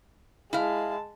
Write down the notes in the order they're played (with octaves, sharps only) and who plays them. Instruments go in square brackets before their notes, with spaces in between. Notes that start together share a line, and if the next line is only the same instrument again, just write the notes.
[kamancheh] G#3 A5 [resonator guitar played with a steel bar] E4 F5